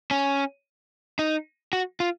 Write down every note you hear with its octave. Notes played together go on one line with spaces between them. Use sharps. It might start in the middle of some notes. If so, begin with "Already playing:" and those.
C#4
D#4
F#4
F4